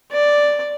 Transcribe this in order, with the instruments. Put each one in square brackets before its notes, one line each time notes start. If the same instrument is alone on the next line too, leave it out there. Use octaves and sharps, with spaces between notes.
[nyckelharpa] D5